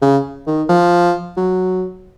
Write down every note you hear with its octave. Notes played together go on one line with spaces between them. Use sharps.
C#3
D#3
F3
F#3